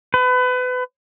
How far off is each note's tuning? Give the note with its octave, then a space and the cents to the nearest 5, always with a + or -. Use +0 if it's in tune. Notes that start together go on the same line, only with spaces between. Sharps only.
B4 +30